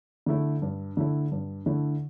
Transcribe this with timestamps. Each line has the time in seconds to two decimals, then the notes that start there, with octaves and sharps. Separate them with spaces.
0.26 D3 A3 E4
0.62 G2
0.97 D3 A3 E4
1.32 G2
1.66 D3 A3 E4